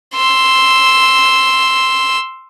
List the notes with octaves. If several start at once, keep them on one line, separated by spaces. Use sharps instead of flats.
C6 E6